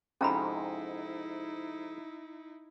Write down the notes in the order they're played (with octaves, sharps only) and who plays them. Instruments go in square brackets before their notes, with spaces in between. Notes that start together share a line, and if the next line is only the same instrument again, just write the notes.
[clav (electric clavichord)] F2 G#2 C3 [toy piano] C#4 A#5 B5 [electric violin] D#4 E4